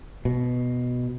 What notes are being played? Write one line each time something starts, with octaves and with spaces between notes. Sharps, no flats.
B2